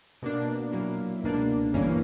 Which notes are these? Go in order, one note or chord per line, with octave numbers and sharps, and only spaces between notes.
B2 A#3 D4
A#2 F#3 A#3 E4
C#2 B2 A#3 D4
G1 G2 E3 A#3 C#4